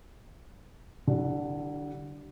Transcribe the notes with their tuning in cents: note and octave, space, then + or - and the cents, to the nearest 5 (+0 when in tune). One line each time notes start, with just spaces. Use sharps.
D3 +0 G3 -45 E4 -30